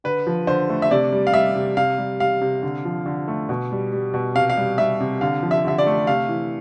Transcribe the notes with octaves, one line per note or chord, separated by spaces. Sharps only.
D3 B4
F3
D3 C5
A3
E5
C3 D5
G3
F5
G3 E5
C3
C3 F5
G3
G3 F5
C3
D3
F3
D3
A3
B2
G3
G3
B2
C3 F5
F5
G3
G3 E5
C3
D3 F5
F3
E5
D3 E5
D5
A3
C3 F5
E3